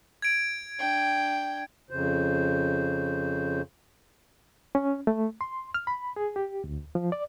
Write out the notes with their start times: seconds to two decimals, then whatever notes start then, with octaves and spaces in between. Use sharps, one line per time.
0.22 G#6 D7
0.79 D4 G5
1.91 F2 C#3 C5
4.75 C#4
5.07 A3
5.41 C6
5.74 F6
5.87 B5
6.16 G#4
6.36 G4
6.64 D2
6.95 F3
7.12 D5